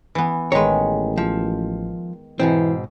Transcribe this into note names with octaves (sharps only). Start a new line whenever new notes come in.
E3 B3
A1 D#3 G#3 B4 C#5
F3
G#2 B2 E3 C4